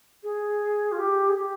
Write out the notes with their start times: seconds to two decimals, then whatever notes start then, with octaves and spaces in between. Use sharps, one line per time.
0.23 G#4
0.92 F4
0.99 G4
1.29 G#4
1.36 G4